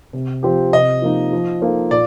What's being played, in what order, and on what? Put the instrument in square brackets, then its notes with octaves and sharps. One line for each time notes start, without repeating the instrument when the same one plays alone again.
[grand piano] C3
F3 C4 G4
[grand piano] C3 [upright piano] D#5
[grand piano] F3 A#3 D#4
F3
A#3 D#4 A4 C5
[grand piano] A#2 [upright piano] D5